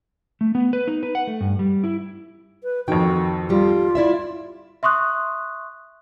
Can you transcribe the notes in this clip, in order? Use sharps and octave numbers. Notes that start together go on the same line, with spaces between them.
A3
B3
B4
D#4
B4
F#5
A3
G2
G3
E4
B4
F2 D#3 F#4 G5
G3 F4
E4 D5 E5
E5 C6 C#6 D#6 F#6